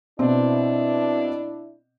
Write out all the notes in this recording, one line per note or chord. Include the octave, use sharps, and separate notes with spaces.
B2 B3 C4 D4 E4